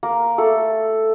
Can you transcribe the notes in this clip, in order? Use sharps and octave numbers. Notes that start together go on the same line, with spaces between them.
A#3 A#4
A3 A4